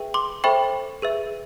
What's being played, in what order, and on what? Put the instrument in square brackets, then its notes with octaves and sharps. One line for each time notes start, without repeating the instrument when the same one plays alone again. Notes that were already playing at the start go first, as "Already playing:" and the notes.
Already playing: [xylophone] G#4 B4 E5 G5
C6 D6
A4 C5 E5 G5 B5 C#6
G#4 B4 E5